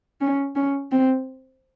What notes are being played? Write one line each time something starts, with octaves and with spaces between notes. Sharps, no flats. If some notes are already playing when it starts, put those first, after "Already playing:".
C#4
C#4
C4